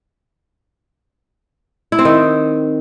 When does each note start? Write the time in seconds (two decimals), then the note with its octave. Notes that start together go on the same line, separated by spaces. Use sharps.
1.92 E4
1.99 C4
2.05 D#3